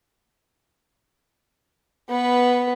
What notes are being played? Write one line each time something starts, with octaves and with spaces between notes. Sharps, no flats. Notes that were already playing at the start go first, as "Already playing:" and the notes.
B3 B4